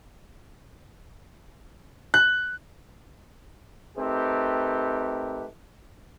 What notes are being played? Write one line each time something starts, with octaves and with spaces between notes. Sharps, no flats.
F#6
A3 C4 D#4 G4 A#4 B4